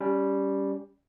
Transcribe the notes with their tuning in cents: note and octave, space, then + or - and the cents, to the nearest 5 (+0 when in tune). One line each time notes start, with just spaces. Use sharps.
G3 +0 C#4 +20